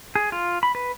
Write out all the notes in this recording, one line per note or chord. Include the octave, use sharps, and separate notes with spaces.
G#4
F4
B5
B4